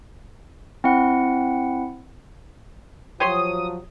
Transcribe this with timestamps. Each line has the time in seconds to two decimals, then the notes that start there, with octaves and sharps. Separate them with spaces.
0.84 C4 E4 F#5
3.20 F3 F#3 G4 C#5 C6 D#6